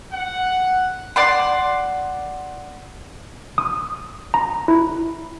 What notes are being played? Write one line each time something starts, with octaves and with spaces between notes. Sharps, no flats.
F#5
D5 F#5 C6
D#6
A#5
E4